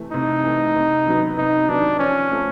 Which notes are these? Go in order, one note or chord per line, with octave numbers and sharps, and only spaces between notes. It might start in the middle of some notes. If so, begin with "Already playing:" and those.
Already playing: C3 E3 A3
C3 D#4
E3 A3
C3
D#3 F#3 B3
C3 D#4
D#3 F#3 B3 D4
F3 C#4
A3 C4 F4 A4